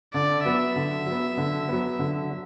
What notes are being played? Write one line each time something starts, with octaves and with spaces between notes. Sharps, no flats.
D3 D5
F#3 B3 E5
D3
F#3 B3
D3
F#3 B3
D3
F#3